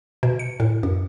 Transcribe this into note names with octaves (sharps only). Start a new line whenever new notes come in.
B2
C#7
A2
F#2